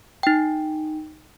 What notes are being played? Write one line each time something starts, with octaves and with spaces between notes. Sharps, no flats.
D#4 G5